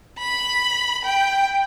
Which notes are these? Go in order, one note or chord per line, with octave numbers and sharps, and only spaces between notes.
B5
G5